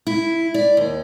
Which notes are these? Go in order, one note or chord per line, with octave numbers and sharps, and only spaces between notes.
E4
D5
D#2